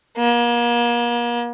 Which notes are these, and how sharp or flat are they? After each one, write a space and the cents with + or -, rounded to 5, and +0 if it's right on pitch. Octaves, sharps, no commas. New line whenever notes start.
A#3 +40